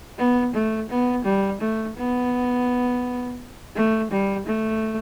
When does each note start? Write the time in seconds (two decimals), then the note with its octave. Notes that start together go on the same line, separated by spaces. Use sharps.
0.18 B3
0.54 A3
0.90 B3
1.25 G3
1.61 A3
1.97 B3
3.76 A3
4.11 G3
4.47 A3